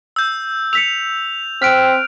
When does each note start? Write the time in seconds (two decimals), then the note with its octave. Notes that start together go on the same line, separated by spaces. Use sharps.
0.16 E6 G6
0.73 E6 B6 C#7 F7
1.62 C4 G5 F6 F#6 B6 D7